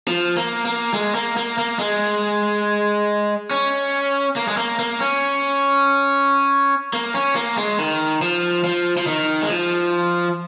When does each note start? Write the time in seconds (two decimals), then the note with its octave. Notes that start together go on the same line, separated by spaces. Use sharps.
0.08 F3
0.37 A#3
0.66 A#3
0.94 G#3
1.15 A#3
1.37 A#3
1.58 A#3
1.79 G#3
3.51 C#4
4.36 A#3
4.48 G#3
4.57 A#3
4.79 A#3
5.00 C#4
6.93 A#3
7.14 C#4
7.36 A#3
7.58 G#3
7.79 D#3
8.22 F3
8.64 F3
8.97 F3
9.07 D#3
9.42 G#3
9.50 F3